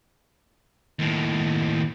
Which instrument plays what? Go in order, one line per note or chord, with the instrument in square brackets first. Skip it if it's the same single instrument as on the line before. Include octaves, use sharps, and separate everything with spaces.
[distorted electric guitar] D#2 A2